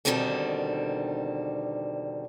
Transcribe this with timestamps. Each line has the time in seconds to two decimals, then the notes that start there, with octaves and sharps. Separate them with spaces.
0.05 E2 B2 D3 D#3 G3 C4